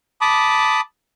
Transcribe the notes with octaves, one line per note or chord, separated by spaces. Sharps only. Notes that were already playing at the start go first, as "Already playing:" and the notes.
A5 B5 D6 D#6